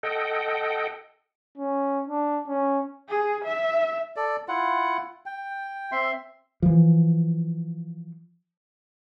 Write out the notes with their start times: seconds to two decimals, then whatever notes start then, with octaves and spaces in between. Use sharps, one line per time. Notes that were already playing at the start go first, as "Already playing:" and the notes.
0.03 A4 D#5 F#5 G5
1.58 C#4
2.08 D4
2.48 C#4
3.09 G#4
3.45 E5
4.16 A4 D5
4.48 E4 F4 F#5
5.26 G5
5.92 C4 E5 C6
6.62 E3 F3